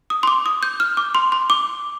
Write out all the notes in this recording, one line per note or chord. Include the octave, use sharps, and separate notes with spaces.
D#6
C6
D6
D#6
G6
F6
D6
C6
C6
D6